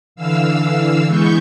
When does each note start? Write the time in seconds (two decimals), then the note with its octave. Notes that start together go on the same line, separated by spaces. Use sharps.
0.15 D3 E3 F5 E6
1.06 E3 G#3 B3 C#6 G6